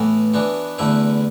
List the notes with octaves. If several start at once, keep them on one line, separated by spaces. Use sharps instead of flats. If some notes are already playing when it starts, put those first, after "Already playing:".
Already playing: A2 E3 B3
E3 B3 D4 F#4
E2 D3 A3 E4 B4